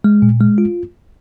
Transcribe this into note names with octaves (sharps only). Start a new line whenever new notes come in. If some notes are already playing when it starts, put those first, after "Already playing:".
G#3
A#2
G#3
F4